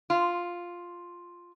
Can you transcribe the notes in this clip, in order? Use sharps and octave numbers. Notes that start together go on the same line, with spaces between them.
F4